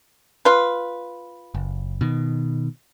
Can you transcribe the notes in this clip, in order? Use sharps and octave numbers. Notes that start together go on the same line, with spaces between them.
F4 B4
F#1
B2 D#3